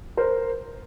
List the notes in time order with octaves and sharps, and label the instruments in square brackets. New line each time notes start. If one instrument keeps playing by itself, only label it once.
[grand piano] A#4 C5